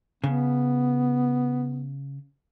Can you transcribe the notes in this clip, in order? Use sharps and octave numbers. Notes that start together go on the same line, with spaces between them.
C#3 B3